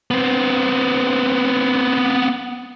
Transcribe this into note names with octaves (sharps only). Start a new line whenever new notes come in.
B3 C4